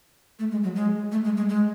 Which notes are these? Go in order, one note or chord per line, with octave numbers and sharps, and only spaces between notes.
A3
G#3
F#3
G#3
A3
G#3
G#3
G#3